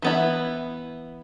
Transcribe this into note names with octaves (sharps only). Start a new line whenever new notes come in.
E3 B3 E4